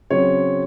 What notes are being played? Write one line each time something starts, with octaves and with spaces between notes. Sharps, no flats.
C#3 F#3 C4 C#5